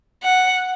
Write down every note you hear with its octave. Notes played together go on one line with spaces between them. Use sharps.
F#5